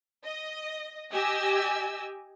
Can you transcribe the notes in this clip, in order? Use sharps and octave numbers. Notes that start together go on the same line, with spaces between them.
D#5
G4 D#5 G#5 E6